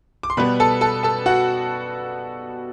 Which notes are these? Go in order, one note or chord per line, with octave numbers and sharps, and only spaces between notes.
D6
C6
B2 G3 B3 B4 B5
A4 A5
A4 A5
A4 A5
F#4 F#5